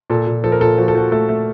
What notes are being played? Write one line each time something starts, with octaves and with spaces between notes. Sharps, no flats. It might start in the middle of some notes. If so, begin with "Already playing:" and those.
A#2 A4
A#2
F3 A4
A#4
A#2 A4
F3 F#4
A4
F3 F#4
A3 A4
A3